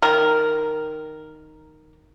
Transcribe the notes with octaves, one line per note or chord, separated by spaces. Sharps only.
D#3 A#4